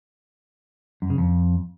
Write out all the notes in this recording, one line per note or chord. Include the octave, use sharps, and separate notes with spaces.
F#2
C#3
F2